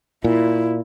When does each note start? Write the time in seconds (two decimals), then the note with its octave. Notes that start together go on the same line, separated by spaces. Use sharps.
0.24 A#2 E4